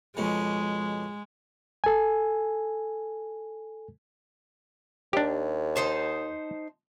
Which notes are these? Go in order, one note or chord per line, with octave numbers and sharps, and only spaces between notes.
F2 B2 G#3 C#4
A4 G#5
D#2 D4 G4
D#4 C5 A5